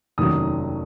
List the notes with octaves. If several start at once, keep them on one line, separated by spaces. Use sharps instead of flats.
F1 D#2 D#3 F#3 C#4 D#6